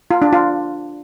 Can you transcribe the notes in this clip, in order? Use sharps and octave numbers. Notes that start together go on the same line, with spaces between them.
F4
D4
F4